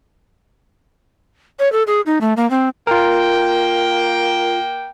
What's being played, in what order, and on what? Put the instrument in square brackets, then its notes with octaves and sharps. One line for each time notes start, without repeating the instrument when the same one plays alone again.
[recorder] C#5
A4
G#4
D#4
A3
A#3
C4
[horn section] A#3 G5 [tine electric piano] F4 A#4